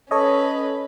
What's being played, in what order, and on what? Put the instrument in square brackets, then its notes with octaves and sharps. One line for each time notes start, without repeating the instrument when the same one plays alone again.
[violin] C#4 B4 [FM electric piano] A4 C#5 D#5